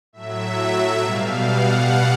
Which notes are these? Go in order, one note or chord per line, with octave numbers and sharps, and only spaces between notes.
A2 F#3 E5
B2 G3 F5
F#5